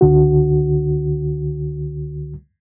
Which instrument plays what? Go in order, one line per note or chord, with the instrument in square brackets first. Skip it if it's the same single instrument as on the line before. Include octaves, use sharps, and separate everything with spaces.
[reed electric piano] C#2 D3 F#4